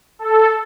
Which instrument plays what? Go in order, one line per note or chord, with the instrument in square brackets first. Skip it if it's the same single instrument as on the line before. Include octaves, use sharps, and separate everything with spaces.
[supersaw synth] A4